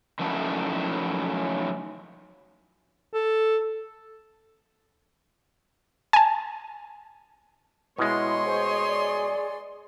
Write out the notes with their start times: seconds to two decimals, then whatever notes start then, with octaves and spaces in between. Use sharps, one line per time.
0.19 D#3 F3 F#3 A3 C#4 E4
3.13 A4
6.13 G#5 A5
7.98 B2 G#3 E4 C#5 D#5 C6
8.46 G#4 C5
8.88 D5